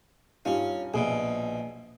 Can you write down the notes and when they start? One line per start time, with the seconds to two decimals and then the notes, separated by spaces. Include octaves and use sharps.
0.45 G2 C#4 D#4 F4
0.94 A#1 B2 G#4 E5